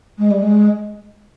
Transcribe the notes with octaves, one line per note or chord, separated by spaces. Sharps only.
G#3
G3
G#3